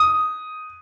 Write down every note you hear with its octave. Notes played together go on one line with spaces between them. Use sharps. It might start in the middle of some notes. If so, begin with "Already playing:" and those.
Already playing: D#6